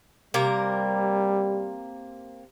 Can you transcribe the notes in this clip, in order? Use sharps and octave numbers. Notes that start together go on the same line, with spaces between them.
C3 G3 A#3 A#4